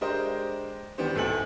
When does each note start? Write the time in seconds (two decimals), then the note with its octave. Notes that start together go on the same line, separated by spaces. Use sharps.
0.01 G#3 D4 G4 A#4 C5 D#5
0.98 D#3 E3 B3 D4 G4 C5
1.15 D1 G#1 A2 A4 G#5 F#7